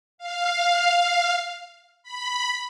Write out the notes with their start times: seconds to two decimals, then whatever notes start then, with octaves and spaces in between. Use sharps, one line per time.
0.18 F5
2.03 B5